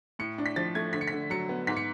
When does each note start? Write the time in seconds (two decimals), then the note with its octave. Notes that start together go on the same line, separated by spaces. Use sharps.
0.19 A2 C#7
0.38 D4
0.46 B6
0.56 F3 A6
0.75 A3 G#6
0.93 D3 B6
1.01 C#7
1.08 B6
1.13 D3
1.30 F#3 C#7
1.49 B3
1.67 G#2 B6
1.77 C#7